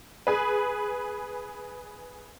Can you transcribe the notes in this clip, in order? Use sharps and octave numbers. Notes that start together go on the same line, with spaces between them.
G#4 B4